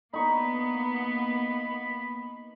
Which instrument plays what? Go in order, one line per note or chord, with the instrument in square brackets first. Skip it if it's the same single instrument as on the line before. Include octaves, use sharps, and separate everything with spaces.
[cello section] A#3 B3 [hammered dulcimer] D#4 C#6 [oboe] B5